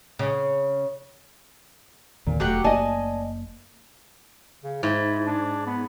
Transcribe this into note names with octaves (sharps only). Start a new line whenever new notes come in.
C#3
D#2 A#2 D3
E1 F#3 A3 G4 F#5
F#1 A#3 D5 D#5 G#5 A5
C#3
G#2 E4
D4
B3